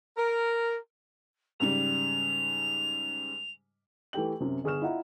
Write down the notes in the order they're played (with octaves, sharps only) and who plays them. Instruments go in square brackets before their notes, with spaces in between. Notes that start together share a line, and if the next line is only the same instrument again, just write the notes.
[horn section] A#4
[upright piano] G#2 C#3 G3 [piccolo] F7
[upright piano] E3 A3 G4 G5 F#7
F#2 C3
G1 G#4 C#6 F6 E7
E4 F4 D#5 E5 F#5 A#5